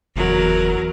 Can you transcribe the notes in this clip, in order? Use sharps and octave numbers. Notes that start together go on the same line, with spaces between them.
F#1 E2 F#3 A#4